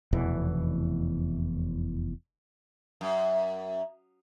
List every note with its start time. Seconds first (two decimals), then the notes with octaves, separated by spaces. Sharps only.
0.13 F1 E2 B2 E3
3.01 F#2